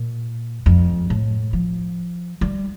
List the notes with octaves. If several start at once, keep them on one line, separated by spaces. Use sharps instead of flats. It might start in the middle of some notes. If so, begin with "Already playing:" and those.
Already playing: A#2
F2
A2
F3
G3